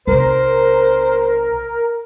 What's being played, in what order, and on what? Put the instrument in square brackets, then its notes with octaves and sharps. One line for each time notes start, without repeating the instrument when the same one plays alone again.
[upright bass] B1 C3 [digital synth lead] A#4 [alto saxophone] C5